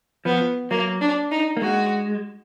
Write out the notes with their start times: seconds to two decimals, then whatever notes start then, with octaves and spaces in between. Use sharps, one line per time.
0.25 F3 B3
0.71 F#3 A#3
1.01 D4
1.31 D#4
1.57 A#3
1.61 G#3 F#4